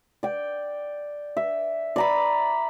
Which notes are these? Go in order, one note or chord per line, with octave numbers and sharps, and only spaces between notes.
D5 G5
E5
D5 A#5 B5